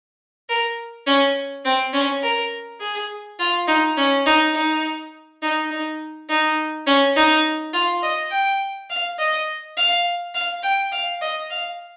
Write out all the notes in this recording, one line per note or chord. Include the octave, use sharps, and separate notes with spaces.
A#4
C#4
C4
C#4
A#4
G#4
F4
D#4
C#4
D#4
D#4
D#4
D#4
D#4
C#4
D#4
F4
D#5
G5
F5
D#5
F5
F5
G5
F5
D#5
F5